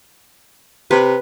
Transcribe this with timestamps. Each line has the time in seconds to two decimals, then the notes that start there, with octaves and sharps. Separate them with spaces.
0.91 C3 B4